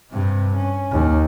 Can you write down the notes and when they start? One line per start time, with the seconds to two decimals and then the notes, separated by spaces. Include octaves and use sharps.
0.11 G2 C3
0.56 C#4
0.91 D#2